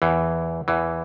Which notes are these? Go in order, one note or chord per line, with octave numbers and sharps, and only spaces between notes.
E2 E3
E2 E3